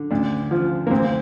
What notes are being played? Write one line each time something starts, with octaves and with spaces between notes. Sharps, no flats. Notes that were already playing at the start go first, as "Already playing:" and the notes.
Already playing: D3
D2 D4
F3
A#3
D2 C4